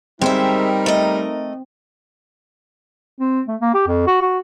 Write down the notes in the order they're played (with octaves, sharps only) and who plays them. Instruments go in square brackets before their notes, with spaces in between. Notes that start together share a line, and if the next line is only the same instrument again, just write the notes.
[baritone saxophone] G3 [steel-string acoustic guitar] G#3 C5 E5 [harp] C4 [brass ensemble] D#4 A#4
[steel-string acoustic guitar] A3 D#5
[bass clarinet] C4
A3
A#3
G4
F2
F#4
F#4